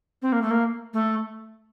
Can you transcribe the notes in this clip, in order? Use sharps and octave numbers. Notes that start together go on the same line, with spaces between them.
C4
A#3
A3
A#3
A3